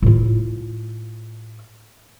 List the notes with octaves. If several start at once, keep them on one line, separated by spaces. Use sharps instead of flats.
A2 F4